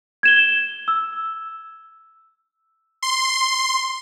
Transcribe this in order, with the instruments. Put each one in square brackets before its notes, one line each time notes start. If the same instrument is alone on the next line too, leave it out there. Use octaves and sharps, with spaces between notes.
[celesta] G#6 E7 G7
E6
[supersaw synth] C6